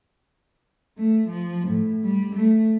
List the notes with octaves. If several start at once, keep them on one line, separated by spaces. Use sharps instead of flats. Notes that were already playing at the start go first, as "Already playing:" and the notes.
A3
F3
A2
G3
A3